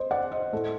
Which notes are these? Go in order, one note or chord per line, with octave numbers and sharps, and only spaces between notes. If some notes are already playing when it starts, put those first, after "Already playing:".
Already playing: C5 D#5
D5 F#5
C5 D#5
A2 A3